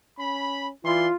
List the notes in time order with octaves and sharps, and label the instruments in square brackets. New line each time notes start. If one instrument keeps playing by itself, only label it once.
[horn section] C#4 B5
[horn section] E3 D5 C6 [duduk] F4